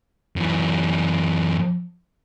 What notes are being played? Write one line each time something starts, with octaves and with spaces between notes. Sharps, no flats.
F#2 E3